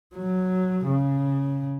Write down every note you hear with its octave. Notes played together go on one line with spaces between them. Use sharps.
F#3
C#3